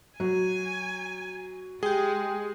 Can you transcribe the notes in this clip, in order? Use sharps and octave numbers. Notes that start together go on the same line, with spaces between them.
F#3 G#5
G#3 G4 G#4 G5